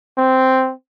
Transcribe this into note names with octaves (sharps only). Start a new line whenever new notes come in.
C4